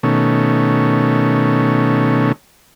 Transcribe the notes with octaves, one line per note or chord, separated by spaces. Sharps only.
B2 D#3 A3 C#4